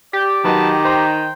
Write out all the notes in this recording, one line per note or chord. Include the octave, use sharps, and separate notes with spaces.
G4 D5
D#3 F#3 B4 D#5 A5
C5 G5 A#5 C6